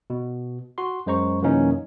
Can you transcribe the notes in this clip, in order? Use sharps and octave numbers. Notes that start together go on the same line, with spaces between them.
B2
F#4 C6
F#2 G#3 C5 A#5 C#6
F#2 C3 E3 A#3 C#4 D#4